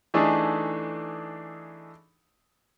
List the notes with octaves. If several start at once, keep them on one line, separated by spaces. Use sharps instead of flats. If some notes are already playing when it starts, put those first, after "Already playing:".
E3 A3 D4 D#4 G#4 A4